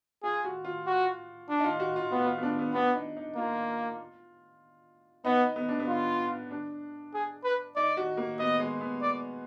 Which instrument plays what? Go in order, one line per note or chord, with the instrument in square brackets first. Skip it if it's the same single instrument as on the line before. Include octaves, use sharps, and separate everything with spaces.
[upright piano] F4 [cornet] G#4
[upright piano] F#4
F4
[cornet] F#4
D4
[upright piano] D#4
F4
F#4
F4
[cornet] B3 [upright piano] F4
[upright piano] F4
B3
D4
B3
[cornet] B3 [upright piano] D4
[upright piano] D#4
D#4
[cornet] A#3 [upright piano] F4
[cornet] B3 [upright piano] D#4
[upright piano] B3
D4
B3
[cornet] F4
[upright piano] D4
[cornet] G#4
B4
[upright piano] D#4 [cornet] D5
[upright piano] F#4
A#3
[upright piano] B3 [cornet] D#5
[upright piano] G#3
B3
[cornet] D5